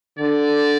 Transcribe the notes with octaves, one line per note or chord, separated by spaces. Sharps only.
D3 D5